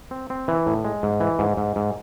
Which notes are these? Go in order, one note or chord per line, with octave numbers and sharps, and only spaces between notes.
C4
C4
E3
A2
G#3
G#2
E3
G#2
G#2
G#2